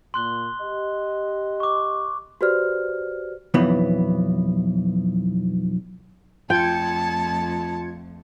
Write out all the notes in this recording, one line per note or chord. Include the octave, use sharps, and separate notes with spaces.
A#2 C6 F#6 G7
G4 D#5
C#6 D6
F#4 G4 B4 C5 D5 F6
B1 F2 E3 B3
F2 A3 F4 G5 A5 G#6 C#7